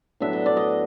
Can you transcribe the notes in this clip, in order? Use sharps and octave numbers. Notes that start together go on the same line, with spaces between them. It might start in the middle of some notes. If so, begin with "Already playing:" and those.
A2 F#3 B3 D4 E5
D#5
D5
D#5